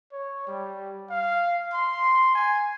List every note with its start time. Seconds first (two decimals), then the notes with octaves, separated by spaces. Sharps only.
0.12 C#5
0.47 G3
1.10 F5
1.74 C6
2.35 G#5